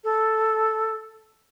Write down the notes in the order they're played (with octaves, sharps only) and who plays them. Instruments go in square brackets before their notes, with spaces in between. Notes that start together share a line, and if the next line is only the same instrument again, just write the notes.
[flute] A4